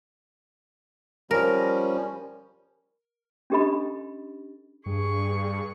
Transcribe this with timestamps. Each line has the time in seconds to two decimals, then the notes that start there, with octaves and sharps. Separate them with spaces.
1.31 F3 G3 C#4 A#4
3.50 C#4 D4 G4 A4 D#5 B5
4.86 G2 G#4 C#6